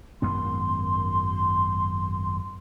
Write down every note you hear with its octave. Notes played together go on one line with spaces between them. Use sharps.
G#1 F#2 B3 C6